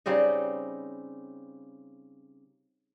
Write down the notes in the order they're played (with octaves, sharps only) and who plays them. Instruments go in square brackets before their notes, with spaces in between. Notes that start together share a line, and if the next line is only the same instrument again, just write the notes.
[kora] C#3 G3 C4 D#4